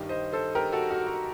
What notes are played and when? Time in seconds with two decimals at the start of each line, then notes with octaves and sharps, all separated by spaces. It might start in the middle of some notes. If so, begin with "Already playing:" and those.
Already playing: G2 D#3 G3
0.09 C5 D#5
0.33 A4 C5
0.55 G4 A#4
0.72 F#4 A4
0.91 F#4
1.07 F#4